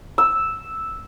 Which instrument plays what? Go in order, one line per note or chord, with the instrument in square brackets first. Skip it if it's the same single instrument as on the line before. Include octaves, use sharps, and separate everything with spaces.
[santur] E6